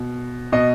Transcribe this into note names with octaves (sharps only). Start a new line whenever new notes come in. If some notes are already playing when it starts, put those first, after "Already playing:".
Already playing: B2
B2 D#5